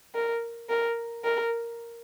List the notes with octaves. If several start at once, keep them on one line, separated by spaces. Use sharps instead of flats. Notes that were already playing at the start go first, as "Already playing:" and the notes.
A#4
A#4
A#4